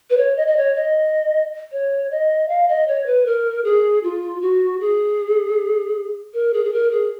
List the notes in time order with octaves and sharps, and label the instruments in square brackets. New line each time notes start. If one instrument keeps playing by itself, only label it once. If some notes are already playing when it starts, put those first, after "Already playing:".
[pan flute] B4
C#5
D#5
D#5
C#5
D#5
C#5
D#5
F5
D#5
C#5
B4
A#4
G#4
F4
F#4
G#4
A#4
G#4
G#4
A#4
G#4